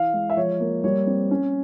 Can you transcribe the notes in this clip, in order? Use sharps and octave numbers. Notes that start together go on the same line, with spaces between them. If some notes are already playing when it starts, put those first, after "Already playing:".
Already playing: E3 F5
G#3
E5
F3 C#5
A#3
G3 C#5
C4
C#4